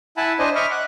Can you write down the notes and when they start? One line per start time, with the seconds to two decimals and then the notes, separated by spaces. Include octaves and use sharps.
0.17 E4 F#5 G#5 A5 B5
0.39 D4 C5 D#5 G#5
0.55 D#5 E5 B5 C#6 D6 F6
0.71 F#5 F#6